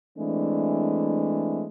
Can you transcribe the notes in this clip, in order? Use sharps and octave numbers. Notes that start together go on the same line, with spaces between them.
E3 G#3 A3 C4 D4